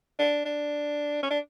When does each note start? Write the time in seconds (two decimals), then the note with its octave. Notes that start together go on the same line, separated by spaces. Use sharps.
0.19 D4
0.45 D4
1.23 C#4
1.30 D4